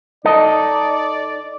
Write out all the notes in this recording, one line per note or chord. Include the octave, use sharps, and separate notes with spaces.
D#4 A4 D5 D#5